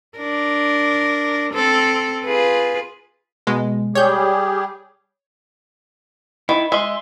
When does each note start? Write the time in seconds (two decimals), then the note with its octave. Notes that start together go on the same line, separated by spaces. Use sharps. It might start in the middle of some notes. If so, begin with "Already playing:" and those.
0.18 D4 A#4
1.53 C4 A4
2.25 F4 G#4 B4
3.47 B2 G#3
3.95 G3 G4 G#4 C#5 G6
6.49 D#3 E4
6.72 G#3 E5 C6